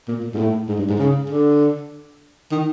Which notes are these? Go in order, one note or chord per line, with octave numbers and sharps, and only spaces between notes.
A#2
A#2
G#2
A2
G#2
G2
G#2
C#3
D3
D#3